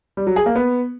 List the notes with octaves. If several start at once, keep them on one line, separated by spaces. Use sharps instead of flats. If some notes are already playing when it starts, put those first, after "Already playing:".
G3
F#3
G#4
A#3
B3